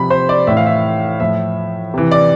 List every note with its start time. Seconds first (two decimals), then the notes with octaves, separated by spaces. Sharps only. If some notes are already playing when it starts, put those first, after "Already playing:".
Already playing: C3 F3 B5
0.10 C5
0.29 D5
0.47 A2 E3 E5
0.57 F5
0.66 E5
1.20 A2 F3 E5
1.94 C3 E3
2.11 D5